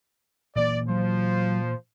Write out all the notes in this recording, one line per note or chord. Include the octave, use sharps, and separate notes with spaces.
A#2 E3 A#3 D5
F3 F#3 C5